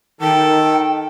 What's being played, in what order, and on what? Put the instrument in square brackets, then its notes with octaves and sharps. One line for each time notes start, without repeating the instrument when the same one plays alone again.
[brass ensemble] D#3 [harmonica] A4 [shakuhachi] G5